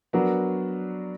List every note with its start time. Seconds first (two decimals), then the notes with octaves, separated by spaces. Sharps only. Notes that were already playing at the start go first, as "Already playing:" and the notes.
0.13 F#3 B3 D4 F#4 A#4